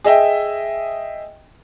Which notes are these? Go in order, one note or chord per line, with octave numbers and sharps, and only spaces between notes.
G#4 D#5 E5 G5